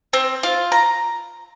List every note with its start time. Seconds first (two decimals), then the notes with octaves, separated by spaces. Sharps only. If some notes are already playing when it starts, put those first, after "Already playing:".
0.13 C4
0.43 F4
0.72 A#5